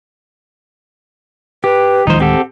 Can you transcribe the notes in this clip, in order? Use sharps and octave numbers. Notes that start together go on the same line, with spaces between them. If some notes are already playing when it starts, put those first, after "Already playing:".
G4 B4
D1 D#3 F3 G#3 D#4 C5
C4 G4 A4 F#5